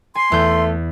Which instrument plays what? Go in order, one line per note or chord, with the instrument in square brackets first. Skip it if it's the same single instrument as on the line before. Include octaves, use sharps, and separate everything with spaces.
[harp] G#5 [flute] C6
[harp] E2 G6 [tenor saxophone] A3